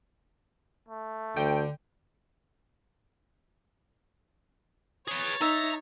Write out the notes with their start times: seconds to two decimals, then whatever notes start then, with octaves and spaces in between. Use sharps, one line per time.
0.89 A3
1.37 D2 D3 G5
5.08 G#4 B4 C#5 A6
5.41 D#4 E5 A#5